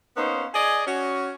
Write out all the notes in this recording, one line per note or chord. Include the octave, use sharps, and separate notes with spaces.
A#3 B3 C#4 D#4 C5
G#4 D5 D#5 G#5
C#4 F#4